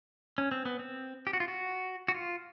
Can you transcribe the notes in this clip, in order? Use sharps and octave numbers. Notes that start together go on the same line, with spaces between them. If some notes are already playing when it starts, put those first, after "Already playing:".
C#4
C4
B3
C4
G4
F#4
F4
F#4
F#4
F4